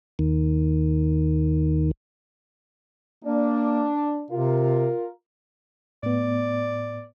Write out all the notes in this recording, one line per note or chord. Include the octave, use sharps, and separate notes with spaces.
D#2 D#3
A#3 D4
C3 F4 A#4
A2 B3 D5